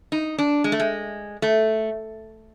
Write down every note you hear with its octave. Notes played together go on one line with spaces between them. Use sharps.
D#4
D4
G#3
A3
G#3
A3